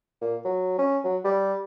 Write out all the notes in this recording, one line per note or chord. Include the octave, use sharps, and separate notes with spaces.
A#2
F#3
C#4
F#3
G3